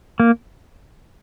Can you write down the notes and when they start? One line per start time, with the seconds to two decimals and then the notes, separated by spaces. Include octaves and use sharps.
0.20 A#3